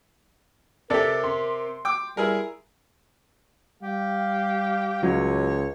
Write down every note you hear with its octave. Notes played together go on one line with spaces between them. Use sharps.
C3 G4 A4 A#4 D5
C6
G5 D6
G3 E4 G#4 A#4
G3 G4 F5
C#2 F#3 C#5